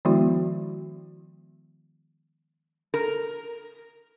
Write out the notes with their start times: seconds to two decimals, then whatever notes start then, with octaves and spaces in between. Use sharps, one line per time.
0.05 D#3 F3 G#3 B3 E4 F#4
2.94 A#4